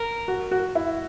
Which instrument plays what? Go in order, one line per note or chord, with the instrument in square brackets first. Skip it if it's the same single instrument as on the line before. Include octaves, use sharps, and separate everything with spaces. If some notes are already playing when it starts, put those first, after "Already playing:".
Already playing: [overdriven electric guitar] A#4
[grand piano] F#4
F#4
E4